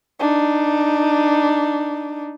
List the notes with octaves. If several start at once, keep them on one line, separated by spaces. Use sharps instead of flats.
D4 D#4